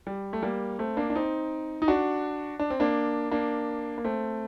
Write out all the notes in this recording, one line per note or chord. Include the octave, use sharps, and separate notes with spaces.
G3
A3
G3 A#3
A3 C4
A#3 D4
D4
C4 D#4
D#4
D4 F#4
D4
C4
A#3 D4
A#3 D4
A#3
A3 C4